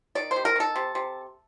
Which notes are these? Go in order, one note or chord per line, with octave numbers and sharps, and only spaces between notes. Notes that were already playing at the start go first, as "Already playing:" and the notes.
D#3 D5
C5
C3
A#4
D#3 A4
C3
C3